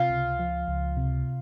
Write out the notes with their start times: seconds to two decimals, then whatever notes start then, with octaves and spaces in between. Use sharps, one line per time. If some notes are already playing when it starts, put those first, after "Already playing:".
Already playing: C3 F4
0.09 C#2
0.39 F3
0.68 C#2
0.97 C3